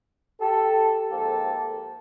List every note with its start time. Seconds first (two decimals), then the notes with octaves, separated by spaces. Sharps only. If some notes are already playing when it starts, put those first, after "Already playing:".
0.39 G4 A4
1.08 G#2 F3 A#3 G4 A4